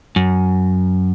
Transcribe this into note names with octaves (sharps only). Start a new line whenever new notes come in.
F#2